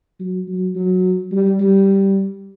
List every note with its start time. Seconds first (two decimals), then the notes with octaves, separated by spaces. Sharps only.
0.20 F#3
0.48 F#3
0.75 F#3
1.31 G3
1.60 G3